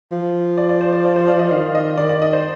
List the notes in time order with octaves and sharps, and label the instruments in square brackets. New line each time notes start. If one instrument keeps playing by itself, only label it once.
[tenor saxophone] F3
[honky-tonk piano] D5
D5
C5
D5
D5
C5
D5
D#5
[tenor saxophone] D#3 [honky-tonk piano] F5
[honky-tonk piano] D#5
[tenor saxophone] D#3 [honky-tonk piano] D5
[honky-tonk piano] D5
D#5
C5